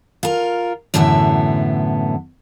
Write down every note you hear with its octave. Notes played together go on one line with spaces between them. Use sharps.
F4 A#4
F#2 A2 D3 E3 B3 E5